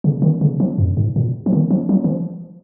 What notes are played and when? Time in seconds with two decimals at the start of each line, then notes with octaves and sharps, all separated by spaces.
0.04 C#3
0.22 D#3
0.41 C#3
0.60 F3
0.78 F#2
0.97 G#2
1.16 A#2
1.46 F3
1.53 D#3
1.71 F3
1.89 F#3
2.04 D#3
2.08 F3